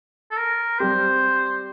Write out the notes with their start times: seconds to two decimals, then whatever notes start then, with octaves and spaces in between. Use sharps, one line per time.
0.31 A4
0.37 A#4
0.79 G3 C4 G4 C5